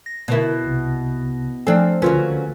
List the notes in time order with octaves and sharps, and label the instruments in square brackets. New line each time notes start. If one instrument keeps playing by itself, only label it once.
[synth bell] A#6
[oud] B2 E4 [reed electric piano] D3 A#4
[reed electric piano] C2 C3
[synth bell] F3 A3 A4 [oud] C4 D4 [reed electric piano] G#5 F6
[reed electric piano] C#2 D3 [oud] F#3 A#3 C#4 [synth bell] F4 A4 B4